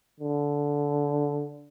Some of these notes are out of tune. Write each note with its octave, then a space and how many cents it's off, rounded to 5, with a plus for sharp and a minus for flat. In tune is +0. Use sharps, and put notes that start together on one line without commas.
D3 -15